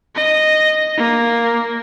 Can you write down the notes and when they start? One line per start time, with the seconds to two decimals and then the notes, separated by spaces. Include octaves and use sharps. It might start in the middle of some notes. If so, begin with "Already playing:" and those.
0.16 D#5
0.97 A#3